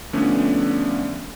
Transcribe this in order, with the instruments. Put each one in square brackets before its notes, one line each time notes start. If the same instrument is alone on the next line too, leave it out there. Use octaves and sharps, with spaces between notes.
[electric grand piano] D3 F3 A3 B3 C#4 D4